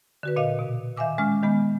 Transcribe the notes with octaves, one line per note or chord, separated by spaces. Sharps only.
D3 F#4 B4
A#2 D#5 F5
B2
D#3 E5 F5 G#5 D6 E6
G#3 C#4 D6 F6
D#3 G#3 B3